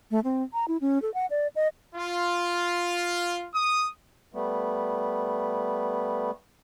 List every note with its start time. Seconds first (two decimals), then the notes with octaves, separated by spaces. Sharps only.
0.11 A3
0.24 C4
0.53 A#5
0.68 E4
0.81 C#4
1.02 A4
1.14 F#5
1.30 D5
1.56 D#5
1.95 F4
3.53 D#6
4.34 G3 A3 B3